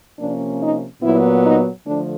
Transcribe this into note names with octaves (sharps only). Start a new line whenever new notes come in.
C3 F3 A#3 C#4 D4
D#4
A#2 F#3 B3 E4
D#4
D3 F3 A3 D4